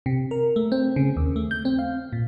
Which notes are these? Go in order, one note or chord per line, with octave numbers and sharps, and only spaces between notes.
C3
A#4
A3
C4
C#3
D#2
A3
G6
C4
F5
A#2